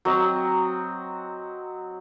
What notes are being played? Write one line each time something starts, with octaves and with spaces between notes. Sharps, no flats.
F#3 C4 D#5